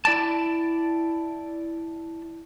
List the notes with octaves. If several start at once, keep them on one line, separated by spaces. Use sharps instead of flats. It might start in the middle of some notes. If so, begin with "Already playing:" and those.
E4 D5 G5 A5